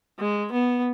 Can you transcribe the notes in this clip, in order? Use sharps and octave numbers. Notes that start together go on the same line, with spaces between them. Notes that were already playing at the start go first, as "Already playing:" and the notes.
G#3
B3